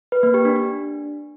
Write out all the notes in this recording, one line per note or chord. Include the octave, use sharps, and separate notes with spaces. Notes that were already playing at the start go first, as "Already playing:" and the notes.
B4
A#3
G4
D4
D4